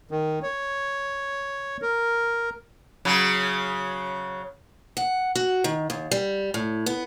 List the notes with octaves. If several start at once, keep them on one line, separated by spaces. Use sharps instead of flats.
D#3
C#5
A#4
C#3 F#3
F#5
F#4
D#3
D#2
G3
A2
B3